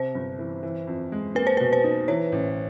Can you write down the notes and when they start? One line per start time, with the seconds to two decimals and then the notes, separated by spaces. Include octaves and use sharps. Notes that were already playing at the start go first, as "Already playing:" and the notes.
Already playing: C3 C5
0.15 G1
0.39 E3
0.63 E3
0.87 F2
1.12 G#3
1.35 A#3 B4
1.47 C5
1.57 B2 B4
1.73 C5
1.84 D#4
2.08 E3 C#5
2.32 A1